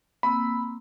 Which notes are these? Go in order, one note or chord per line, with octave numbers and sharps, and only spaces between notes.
A#3 C4 B5 E6